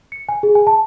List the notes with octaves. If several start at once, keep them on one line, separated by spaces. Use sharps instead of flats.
C#7
G#5
G#4
G#5
A5